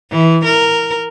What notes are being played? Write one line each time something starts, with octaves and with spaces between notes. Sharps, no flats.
E3
A#4